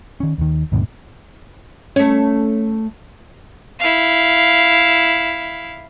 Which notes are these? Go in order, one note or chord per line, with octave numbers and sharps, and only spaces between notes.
D#3 C#4
D#2 D#3
D#2 G#2 B2 D3
A3 C#4 C#5
E4 F5